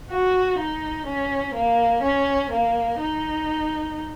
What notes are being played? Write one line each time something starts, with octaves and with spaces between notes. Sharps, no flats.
F#4
D#4
C#4
A#3
C#4
A#3
D#4